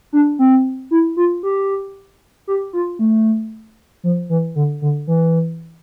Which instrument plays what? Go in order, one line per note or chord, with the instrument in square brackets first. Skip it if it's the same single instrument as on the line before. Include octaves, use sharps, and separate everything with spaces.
[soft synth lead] D4
C4
E4
F4
G4
G4
F4
A3
F3
E3
D3
D3
E3